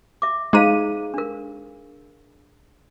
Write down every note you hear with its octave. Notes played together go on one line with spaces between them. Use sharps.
E5 D6
G#3 D#4 G#4 C5 F5 D#7
D4 A#4